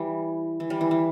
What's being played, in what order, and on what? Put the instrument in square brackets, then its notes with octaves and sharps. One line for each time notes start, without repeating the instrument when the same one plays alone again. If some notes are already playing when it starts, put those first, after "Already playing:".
Already playing: [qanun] E3 G3
E3
G3
E3
E3